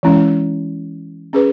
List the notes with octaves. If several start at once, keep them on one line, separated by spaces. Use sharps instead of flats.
E3 G#3 C#4 E4
C#4 G#4 B4